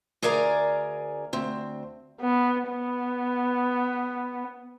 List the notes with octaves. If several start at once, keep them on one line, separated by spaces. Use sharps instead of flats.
D2 G#4 A#4 D5 G#5 A#5
D2 C4
B3
B3